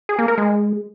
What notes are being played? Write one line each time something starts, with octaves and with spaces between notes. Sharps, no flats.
G#4
A#3
A#4
G#3